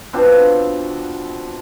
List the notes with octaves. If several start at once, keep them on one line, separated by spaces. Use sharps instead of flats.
B2 C4 D4 F4